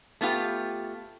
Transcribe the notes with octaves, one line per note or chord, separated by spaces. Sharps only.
A3 B3 F4 G4